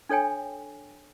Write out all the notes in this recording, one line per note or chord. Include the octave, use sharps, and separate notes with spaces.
D4 A4 C#5 G5 G#5